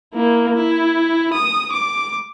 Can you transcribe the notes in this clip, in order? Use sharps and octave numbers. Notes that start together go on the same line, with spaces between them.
A#3 E4
E4
D#6
D6